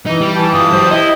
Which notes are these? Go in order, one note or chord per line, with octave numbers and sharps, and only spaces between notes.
E3 D#4
G3 G5
E3 G4 G#5 A5
G2 F4 A5 D#6
F#3 G4 C5
E4 G4 D#5